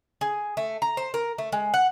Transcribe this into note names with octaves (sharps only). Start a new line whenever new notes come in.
G#4
A3
A#5
C5
A#4
A3
G#3
F#5